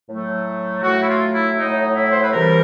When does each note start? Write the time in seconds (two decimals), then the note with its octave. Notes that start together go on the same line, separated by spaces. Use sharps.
0.08 A2 F#3 A3
0.83 A2 F#3 A3 F#4
1.01 E4
1.08 F4
1.33 E4
1.57 A2 F#3 A3 D#4
1.95 E4
2.12 C5
2.22 B4
2.33 C3 E3 G3 A#4